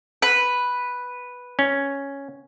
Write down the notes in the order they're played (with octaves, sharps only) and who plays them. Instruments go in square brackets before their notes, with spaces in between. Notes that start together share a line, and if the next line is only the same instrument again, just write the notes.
[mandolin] B4
[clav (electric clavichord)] C#4